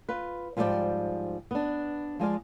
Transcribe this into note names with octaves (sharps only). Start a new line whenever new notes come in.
F4 B4
G#2 F3 G3 G4 D5 G5
B3 D4
F3 G#3 D5 F5